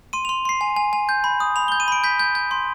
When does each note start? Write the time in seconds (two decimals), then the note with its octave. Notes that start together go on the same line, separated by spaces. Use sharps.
0.13 C6 D#7
0.25 C6 F7
0.45 C6 C7
0.61 G#5
0.76 G#5
0.93 G#5
1.09 G6
1.24 B5
1.40 D#6
1.56 B5 F7
1.68 G6 G7
1.80 D#7
1.88 B5 D7
2.04 G6 B6
2.20 G6
2.35 G6
2.51 C6